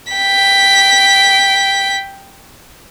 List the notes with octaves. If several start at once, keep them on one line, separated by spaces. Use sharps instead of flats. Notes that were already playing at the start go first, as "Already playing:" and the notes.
G5 B6